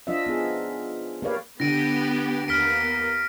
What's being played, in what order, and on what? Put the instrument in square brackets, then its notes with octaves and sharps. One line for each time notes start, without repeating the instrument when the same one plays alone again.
[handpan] F3 D4 F4 D#5 E5
B3 D#4 G#4
A#3 G4 B4 C#5 D5 F5
[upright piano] D3 [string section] B3 G4 [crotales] A#6 D7 D#7
[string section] D#2 A#3 B3 [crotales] F6 B6 D7